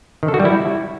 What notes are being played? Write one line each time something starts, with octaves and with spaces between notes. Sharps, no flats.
D#3
A4
F#4
G3
E4